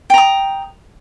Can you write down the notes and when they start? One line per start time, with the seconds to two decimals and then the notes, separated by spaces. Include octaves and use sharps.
0.10 G5
0.14 A#5
0.18 D#6